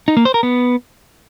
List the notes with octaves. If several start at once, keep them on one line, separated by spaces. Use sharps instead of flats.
D#4
A#3
C5
A#4
B3